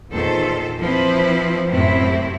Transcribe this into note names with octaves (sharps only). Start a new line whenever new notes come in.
E2 A#2 D#3 A4 C5
F3 C4 E4 B4
F#2 A2 C3 C4 E4